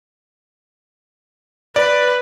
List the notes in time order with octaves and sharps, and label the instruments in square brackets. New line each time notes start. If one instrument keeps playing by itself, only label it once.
[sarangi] B4 [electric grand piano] D5